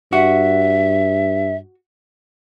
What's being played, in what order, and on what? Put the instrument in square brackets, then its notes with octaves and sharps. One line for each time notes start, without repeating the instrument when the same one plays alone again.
[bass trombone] G2 [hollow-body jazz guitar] F#4 [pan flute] E5